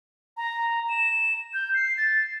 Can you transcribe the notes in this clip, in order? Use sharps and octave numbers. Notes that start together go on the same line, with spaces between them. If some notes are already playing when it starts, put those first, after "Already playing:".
A#5
E7
G6
C7
A6